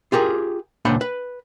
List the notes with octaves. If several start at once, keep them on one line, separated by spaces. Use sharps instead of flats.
F4 G4 G#4 A#4
C#2 A#2 D4 C5 F#5 B5
B4